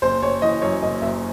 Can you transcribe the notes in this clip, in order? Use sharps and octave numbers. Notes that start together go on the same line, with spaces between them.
F#1 C5
F#1 C#5
E3 D#5
F#2 C#5
F#1 D#5
F#1 E5